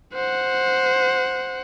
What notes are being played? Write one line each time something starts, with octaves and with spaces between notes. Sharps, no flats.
C5 F#5